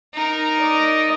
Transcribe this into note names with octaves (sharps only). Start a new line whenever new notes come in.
D#4 A#4
D5 D#5